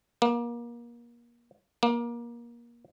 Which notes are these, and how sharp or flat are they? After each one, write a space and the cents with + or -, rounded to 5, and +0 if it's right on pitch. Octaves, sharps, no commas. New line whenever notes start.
A#3 +30
A#3 +25